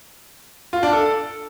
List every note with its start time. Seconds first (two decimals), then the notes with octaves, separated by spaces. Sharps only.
0.73 F4
0.83 D4
0.93 A4